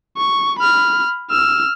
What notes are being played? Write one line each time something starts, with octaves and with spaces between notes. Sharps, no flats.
C#6
B5 F6
E6 F6